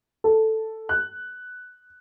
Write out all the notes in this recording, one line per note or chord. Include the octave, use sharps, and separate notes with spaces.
A4
F#6